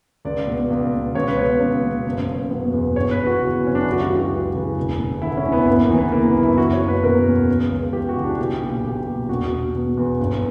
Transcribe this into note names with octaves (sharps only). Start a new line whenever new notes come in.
C#2 D5
B2
C#2
B2
C#2 C#5
B4
B2 C#5
C#2
B2
F#1
F#1
B2
E2
G1 C#5
B4
E3
F#4
C#3
F#2 C#4
D4
C#2 E4
F#4
G4
C#2
F#4
E3
C#3
E1
E1
D3 E4
C#4
D2
B3
G1 B3
A#3
E3
B3
C#3 A#3
B3
F#2
E4
F#1 F#4
C#5
F#1
B4
B2 A#4
E2
C#2
C#2
E3 G4
F#4
C#3
D4
B1 G4
A#2
B1 G4
A#2
E1 F#4
E1
B2
E2
G1